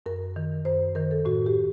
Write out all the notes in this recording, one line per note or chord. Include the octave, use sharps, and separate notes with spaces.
F#2 A#4
D#3
F#2 C5
D#3 A#4
A4
A2 F#4
G4